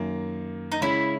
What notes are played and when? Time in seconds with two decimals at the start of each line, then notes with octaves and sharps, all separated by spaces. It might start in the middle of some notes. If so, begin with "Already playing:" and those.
Already playing: F#2 D#3 A#3
0.72 D#4
0.81 C#3 G#3 C#4 E4